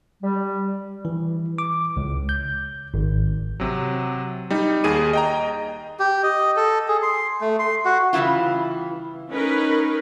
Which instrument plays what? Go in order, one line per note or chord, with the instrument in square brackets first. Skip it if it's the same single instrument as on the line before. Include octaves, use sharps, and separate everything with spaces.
[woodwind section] G3
[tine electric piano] E3
D6
C#2
G6
G#1
[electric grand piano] C3 F#3
G3 D#4
D#2 G#4 D#7
D#5 G5 A#5
[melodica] G4
D#5
A4
G#4
C6
A3
C6
F#4
[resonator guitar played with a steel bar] C#3 E3 G3 E4 F4
[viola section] C#4 D#4 A#4 B4